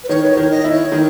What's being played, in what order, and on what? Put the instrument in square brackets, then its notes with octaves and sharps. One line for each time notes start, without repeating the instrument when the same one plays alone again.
[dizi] B4
[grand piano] D#3 [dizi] C#5
[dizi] B4
C#5
[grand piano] D#3
[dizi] D#5
[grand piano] E4
[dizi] C#5
[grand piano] D#3